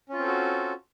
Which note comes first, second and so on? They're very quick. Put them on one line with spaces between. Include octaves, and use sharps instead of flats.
C#4 F4 C4 A4 F#4